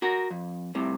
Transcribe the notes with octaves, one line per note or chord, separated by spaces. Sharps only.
F#4 A#4
F2
C2 A2 C3